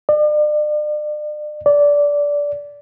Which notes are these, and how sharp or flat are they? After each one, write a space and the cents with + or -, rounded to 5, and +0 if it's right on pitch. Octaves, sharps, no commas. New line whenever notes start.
D5 +40
D5 -15